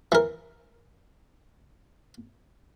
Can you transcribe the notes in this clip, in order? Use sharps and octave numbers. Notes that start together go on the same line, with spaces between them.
E3 A#4